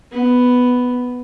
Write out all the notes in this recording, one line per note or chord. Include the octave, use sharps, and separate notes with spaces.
B3